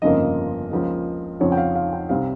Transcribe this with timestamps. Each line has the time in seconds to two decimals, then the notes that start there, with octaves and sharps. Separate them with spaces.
0.02 G1 F2 C#3 F3 A#3 D#5
0.71 C#2 C#3 F3 A#3
1.40 F2 C#3 F3 C#5
1.52 G5
1.57 F5
1.75 F5
1.93 G5
2.09 C2 C3 G3 C4 F5